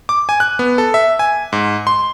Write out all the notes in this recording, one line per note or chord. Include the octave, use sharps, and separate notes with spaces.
D6
G#5
F#6
B3
A4
E5
G#5
G#2
C6